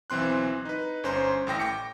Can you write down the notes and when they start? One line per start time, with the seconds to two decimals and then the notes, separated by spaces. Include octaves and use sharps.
0.10 B1 E3 C4 C6 F#6
0.65 D#4 B4
1.04 G1 C#4 C5 A#5 C6
1.47 A1 A2 G5 A#6
1.59 G5 D6 C#7